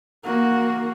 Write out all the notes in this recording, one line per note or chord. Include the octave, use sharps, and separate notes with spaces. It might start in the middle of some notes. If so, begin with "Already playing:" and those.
A#3 F#4